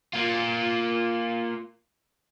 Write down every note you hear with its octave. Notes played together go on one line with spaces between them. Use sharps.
A#3 F4